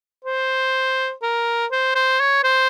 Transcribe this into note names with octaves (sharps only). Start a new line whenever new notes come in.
C5
A#4
C5
C5
C#5
C5